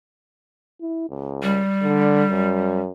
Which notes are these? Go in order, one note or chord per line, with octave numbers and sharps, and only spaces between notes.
E4
C#2
G3
D3
F#2